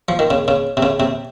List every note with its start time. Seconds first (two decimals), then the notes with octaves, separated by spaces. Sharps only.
0.09 F3
0.19 D#3
0.30 C#3
0.48 C#3
0.77 C3
0.83 C#3
1.00 C3